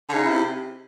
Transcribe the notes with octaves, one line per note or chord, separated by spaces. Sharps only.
D3
C#3 D#4
E4
C3